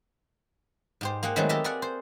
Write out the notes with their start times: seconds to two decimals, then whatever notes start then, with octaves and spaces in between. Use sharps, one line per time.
1.01 G#2 G4 C5
1.23 A#3 G4 G#4 F#5 G5
1.36 D#3 F#3 G#3 A3 B3 C4
1.49 G4 A4 A#4 D#5 E5
1.64 G#4 A#4 D5 F#5
1.82 C5